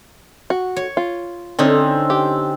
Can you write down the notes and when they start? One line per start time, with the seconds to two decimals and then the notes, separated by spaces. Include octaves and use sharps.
0.50 F#4
0.76 C#5
0.97 F4
1.59 D3 C4 C#4 D#4
2.10 G4